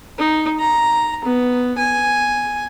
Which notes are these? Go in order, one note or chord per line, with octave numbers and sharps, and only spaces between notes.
D#4
A#5
B3
G#5